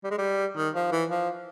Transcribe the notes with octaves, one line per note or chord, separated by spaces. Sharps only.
G3
G#3
G3
D#3
F3
E3
F3